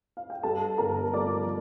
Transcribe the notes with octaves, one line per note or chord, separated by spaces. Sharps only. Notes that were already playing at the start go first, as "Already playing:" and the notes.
F5
G5
G2 A4 A5
G1 A#4 A#5
F3 D5 D6